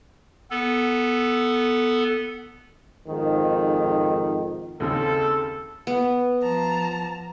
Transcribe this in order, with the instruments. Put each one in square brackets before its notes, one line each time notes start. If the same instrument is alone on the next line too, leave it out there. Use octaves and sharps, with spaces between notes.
[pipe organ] B3 A4
[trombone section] F2 G#2 D#3
[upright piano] D#2 C#3 C4 [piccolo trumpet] A4
[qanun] B3
[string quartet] F3 A5 A#5